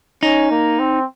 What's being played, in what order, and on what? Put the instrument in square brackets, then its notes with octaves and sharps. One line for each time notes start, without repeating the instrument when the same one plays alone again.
[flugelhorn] C#4 [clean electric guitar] D#4
[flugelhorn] A#3
C4